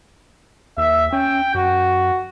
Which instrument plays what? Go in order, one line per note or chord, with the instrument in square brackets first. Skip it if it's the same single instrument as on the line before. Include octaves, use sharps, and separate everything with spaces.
[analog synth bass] D#2 [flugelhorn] E5
[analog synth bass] C#4 [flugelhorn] G5
[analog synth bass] F#2 [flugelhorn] F#4